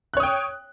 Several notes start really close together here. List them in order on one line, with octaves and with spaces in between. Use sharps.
F#6 C#5 D#6 G5